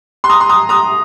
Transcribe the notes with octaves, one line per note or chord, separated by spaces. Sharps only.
C6
A#5 D#6
C6
A#5 D#6
A#5 D#6